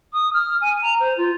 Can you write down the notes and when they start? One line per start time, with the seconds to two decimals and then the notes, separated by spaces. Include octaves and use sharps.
0.13 D#6
0.33 F6
0.61 G#5
0.82 A#5
1.00 C5
1.17 F4